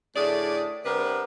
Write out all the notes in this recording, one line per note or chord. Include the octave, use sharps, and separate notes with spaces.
A2 D3 A3 G#4 D5
C3 G3 B3 D4 A#4 B4